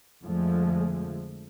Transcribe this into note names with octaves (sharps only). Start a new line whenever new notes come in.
F2 D3 F3 G#3 A3